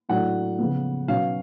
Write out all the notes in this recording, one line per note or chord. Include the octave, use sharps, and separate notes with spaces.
A2 F#3 A3 D4 F#5
C#3 F3 B3
B2 F#3 C#4 F5